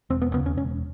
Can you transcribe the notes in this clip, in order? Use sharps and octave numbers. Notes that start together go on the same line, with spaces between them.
E1 C4
B3
D#2 C#3 B3
C#4
E1 C#4